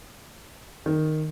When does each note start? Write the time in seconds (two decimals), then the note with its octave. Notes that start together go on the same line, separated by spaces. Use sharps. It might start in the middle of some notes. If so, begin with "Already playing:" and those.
0.86 D#3